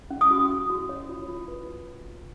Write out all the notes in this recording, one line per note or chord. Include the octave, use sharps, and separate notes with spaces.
C#4
D#6
F#4
F#4
F#4
C#5
F4
F4
B4